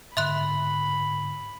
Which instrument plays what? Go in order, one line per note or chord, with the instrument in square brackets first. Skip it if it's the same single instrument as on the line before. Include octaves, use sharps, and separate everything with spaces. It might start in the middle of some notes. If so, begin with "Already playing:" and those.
[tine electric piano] G#2 D3 [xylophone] E5 C6 F#6 [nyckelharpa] B5